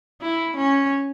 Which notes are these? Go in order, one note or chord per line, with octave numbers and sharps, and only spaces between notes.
E4
C#4